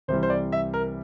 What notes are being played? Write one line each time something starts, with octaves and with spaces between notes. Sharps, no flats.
C2 C3 E3 G3 C5
C5
D5
E5
A#4